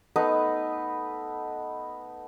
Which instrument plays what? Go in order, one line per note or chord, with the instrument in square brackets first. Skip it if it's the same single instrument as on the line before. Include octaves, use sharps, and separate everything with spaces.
[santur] A3 B3 D#4 B4